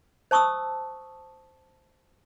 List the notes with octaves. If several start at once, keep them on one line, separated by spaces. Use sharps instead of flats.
C5 A5 C#6 D#6 E6